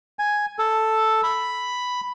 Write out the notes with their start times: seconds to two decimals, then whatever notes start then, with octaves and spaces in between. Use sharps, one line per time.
0.19 G#5
0.59 A4
1.23 B5